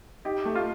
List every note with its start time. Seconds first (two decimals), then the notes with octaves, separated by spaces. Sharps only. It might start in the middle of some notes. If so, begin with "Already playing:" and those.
0.25 D#4 G4
0.45 A3
0.55 F4